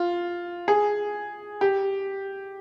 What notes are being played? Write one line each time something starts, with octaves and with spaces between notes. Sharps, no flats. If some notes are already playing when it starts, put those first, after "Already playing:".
Already playing: F4
G#4
G4